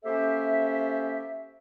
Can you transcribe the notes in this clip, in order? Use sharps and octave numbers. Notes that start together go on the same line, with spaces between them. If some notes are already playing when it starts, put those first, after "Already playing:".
A#3 C#4 G4 A4 C5 E5